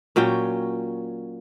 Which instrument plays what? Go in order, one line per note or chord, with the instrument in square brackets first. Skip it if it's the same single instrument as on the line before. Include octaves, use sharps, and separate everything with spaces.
[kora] A#2 F#3 C#4 G5